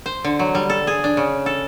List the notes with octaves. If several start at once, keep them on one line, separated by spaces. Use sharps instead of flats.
C5
D3
F#3
G3
A4
G#4
D4
C#3
A4